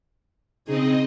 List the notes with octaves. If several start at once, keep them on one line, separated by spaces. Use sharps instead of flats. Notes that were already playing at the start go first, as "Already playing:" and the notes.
C#3 C4 D#4 G#4 D#5